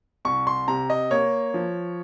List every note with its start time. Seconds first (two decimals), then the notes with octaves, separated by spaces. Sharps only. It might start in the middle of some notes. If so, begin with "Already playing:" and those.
0.25 C2 C#6
0.47 C6
0.68 C3 A#5
0.90 D#5
1.11 A#3 C#5
1.54 F3